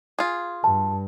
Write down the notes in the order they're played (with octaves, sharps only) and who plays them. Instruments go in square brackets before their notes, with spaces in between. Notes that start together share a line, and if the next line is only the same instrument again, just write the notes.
[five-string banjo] F4 G#4
[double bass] G2 [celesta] A5